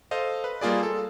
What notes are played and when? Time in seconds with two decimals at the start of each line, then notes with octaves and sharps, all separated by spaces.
0.11 A4 C5 D#5 F5
0.44 B4
0.61 G3 A#3 F4 G#4 D5
0.83 A4